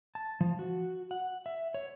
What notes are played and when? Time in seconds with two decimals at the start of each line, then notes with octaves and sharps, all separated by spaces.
0.15 A5
0.41 F3
0.59 F#4
1.11 F#5
1.46 E5
1.74 C#5